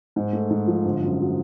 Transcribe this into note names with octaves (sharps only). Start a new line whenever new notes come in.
G#2
A3
G#2
F3
G1
F#2
F#3